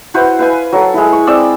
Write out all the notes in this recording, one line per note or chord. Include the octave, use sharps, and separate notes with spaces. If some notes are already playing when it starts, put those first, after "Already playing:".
E4 F#4 B4 C5
B4 F5 G#5
F#3 A4
G#3 E4
C#6
C4 D5 E6